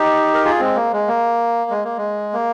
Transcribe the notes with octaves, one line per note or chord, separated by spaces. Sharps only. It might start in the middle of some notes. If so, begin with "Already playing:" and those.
Already playing: D#4 G4
A#4
F4 G#4
G#3 C4
A#3
G#3
A#3
G#3
A#3
G#3
A#3